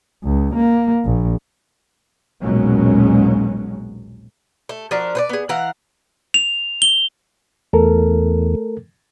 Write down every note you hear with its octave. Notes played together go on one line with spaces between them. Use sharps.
C#2
A#3
A#1
A#1 D#2 B2 F#3 G#3 C#4
A3
F3 D4 F#4 A#4
B4 C5 D5
B3 G#4
E3 F5 F#5 A#5
F7
G7
E2 A3 A4 A#4